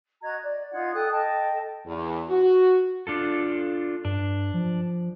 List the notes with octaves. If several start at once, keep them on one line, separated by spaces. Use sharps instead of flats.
F#4 D#5 A#5 G#6
D5
D#4 F4 F#5 G#6
A4 G5 D#6 F#6
A4 D#5 G5 A5
E2
F#4
D4 F4 A4
G2 D4
F3